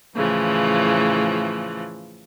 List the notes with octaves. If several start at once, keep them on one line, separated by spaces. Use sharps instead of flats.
A2 C#3 E3 F3